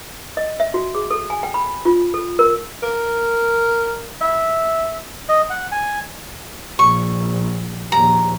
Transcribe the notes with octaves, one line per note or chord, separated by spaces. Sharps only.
D#5
E5
F#4
G#4
A4
G#5
G5
B5
F4
A4
A#4
A#4
E5
D#5
F#5
G#5
A#1 C#6
A#1 D#2 A#5